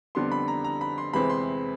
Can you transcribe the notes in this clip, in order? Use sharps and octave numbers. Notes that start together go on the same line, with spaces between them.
F2 D3 G3 B3 C6
B5
A#5
A#5
B5
C6
E2 C3 E3 G#3 C4 B5
C6